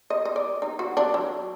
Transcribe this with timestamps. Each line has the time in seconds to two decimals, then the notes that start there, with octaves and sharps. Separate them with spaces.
0.10 D#5
0.25 D#5
0.36 D5
0.62 D#4
0.79 F#4
0.97 D4
1.14 F#3